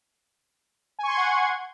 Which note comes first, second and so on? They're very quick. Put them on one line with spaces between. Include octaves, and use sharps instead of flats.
G#5 C#6 C6 G#6 F#5